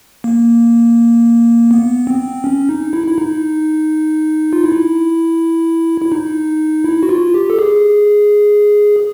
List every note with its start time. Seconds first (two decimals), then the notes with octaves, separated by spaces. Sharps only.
0.24 A#3
1.71 B3
2.07 C4
2.44 C#4
2.69 D#4
2.93 E4
3.08 E4
3.18 D#4
4.53 F4
4.64 E4
6.01 E4
6.12 D#4
6.84 E4
7.03 F#4
7.09 F4
7.34 G4
7.50 A4
7.59 G#4